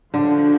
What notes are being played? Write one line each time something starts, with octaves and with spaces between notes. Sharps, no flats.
D3 F3 G#3 D4 F#4